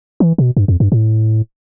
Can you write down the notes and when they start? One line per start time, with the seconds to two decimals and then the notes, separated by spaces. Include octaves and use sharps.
0.20 E3
0.38 B2
0.57 G2
0.68 F2
0.80 G2
0.92 A2